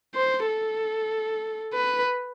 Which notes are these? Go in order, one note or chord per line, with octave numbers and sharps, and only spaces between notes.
C5
A4
B4